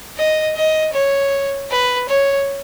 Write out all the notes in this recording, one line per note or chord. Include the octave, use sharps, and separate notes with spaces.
D#5
D#5
C#5
B4
C#5